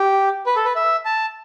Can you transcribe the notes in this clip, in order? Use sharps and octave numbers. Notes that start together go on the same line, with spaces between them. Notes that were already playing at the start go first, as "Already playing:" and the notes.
Already playing: G4
B4
A4
B4
E5
A5